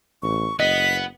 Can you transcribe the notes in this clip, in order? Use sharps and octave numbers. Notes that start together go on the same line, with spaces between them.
A1 C#6
F#1 B3 D#5 B6